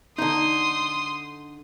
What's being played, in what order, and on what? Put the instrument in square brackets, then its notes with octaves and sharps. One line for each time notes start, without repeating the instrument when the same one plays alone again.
[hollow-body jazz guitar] D3 D#4 [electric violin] C6 D#6